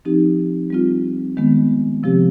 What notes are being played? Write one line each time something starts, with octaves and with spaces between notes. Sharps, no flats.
F3 C4 D#4 G4
G3 C4 F4
D#3 G#3 B3
C3 F3 C4 G4